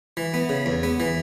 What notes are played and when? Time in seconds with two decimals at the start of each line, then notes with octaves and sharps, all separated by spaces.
0.17 E3
0.34 B3
0.49 C#3
0.66 E2
0.83 B3
1.00 E3